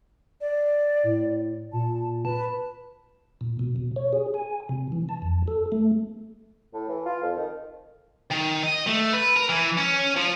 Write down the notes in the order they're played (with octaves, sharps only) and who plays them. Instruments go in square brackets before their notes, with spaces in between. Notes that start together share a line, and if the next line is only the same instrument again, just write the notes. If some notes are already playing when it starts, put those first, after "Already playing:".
[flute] D5
[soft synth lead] A2
[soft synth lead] A#2 [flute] A5
[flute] B4 [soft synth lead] A5
[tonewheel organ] A#2
B2
B2
C#5
G#4
G#5
C3
E3
A5
F2
A4
A3
[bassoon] A2
E3
F4
F2
D#3
[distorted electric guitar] D#3
D#5
A3
B4
A#4
E3
C#4
F3